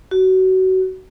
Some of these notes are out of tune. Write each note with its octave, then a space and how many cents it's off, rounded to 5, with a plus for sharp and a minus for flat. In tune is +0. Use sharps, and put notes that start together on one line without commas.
F#4 +25